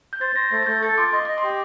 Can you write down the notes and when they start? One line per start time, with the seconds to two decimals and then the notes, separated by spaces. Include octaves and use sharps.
0.13 G6
0.21 C5 A6
0.36 C5 A#6
0.51 A3 A6
0.63 A6
0.66 A3 G6
0.82 A4 A6
0.97 F4 D6
1.13 D#5 C6
1.25 D#5 D6
1.38 C6
1.43 G4